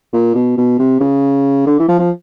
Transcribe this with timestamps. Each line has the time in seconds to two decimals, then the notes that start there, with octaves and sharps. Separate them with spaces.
0.13 A#2
0.35 B2
0.57 B2
0.79 C3
1.00 C#3
1.67 D3
1.79 E3
1.88 F3
1.99 F3